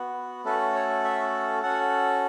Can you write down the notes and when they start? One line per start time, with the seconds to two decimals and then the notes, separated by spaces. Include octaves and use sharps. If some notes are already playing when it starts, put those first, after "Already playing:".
Already playing: B3 F#4
0.45 A3 C#4 F#4 A4 B4
0.75 C#5
1.04 E5
1.62 C#4 F#4 A4 F#5